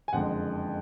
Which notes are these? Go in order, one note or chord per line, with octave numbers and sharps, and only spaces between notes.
G#5
F#1 F2 D3 G#3 F#5